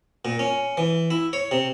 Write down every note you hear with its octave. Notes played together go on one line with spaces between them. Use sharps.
A#2
C#4
E3
E4
C#5
C3